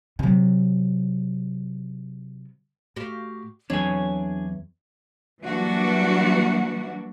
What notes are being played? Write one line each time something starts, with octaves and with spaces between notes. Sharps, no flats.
C3 F#3
A2 F#4 G4 F5
E2 F#3 C4 D4 G#4 C#5 G#5
E3 F#3 G3 A#3 D4 F#4